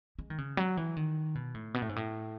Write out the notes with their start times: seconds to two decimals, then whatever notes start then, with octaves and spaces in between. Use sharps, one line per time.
0.19 G#3
0.30 D#3
0.38 C#3
0.57 F#3
0.77 E3
0.97 D#3
1.35 B2
1.54 A2
1.74 B2
1.82 A2
1.89 G#2
1.96 A2